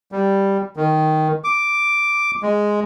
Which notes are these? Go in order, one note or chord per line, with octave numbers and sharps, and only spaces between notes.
G3
D#3
D6
G#3